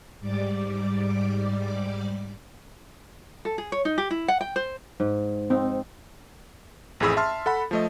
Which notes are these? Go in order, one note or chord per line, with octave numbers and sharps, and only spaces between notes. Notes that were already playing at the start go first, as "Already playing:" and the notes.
G#2 G3 D5 D6
A4
G#4
C#5
D#4
G4
E4
F#5
G5
C5
G#2
C4 D#4
A1 F2 A2 G#4 B5 E6
E5 A5 C6 F6
A4 F#5 B5
F3 A3 D#5